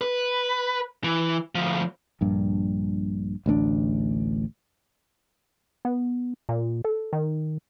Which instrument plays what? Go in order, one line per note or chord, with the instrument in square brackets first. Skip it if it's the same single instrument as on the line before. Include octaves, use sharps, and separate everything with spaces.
[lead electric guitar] B4
E3
D2 F3
[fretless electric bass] A#1 G2
A1 D2 B3 D4
[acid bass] B3
A#2
A4
D#3